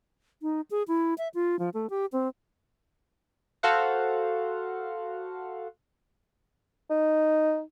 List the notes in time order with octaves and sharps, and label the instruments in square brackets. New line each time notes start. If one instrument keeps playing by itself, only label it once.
[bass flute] D#4
G#4
E4
E5
F4
F3
A3
G4
C4
[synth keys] F#4 A4 C5 F5 F#5
[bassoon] D#4